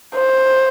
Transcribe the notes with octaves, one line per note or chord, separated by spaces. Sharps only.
C5